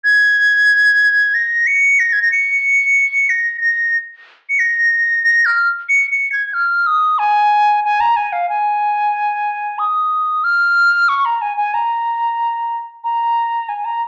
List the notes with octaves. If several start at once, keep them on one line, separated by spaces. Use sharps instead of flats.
G#6
A#6
C#7
A#6
G#6
A#6
C#7
A#6
A#6
C#7
A#6
A#6
F6
C#7
C#7
G#6
F6
D#6
G#5
G#5
A#5
G#5
F5
G#5
D#6
F6
C#6
A#5
G#5
G#5
A#5
A#5
G#5
A#5